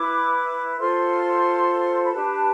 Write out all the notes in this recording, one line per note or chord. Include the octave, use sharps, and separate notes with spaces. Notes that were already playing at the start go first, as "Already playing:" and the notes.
Already playing: E4 B4 D6
F4 A4 C5 C6
B5
D4 G4 B4 A5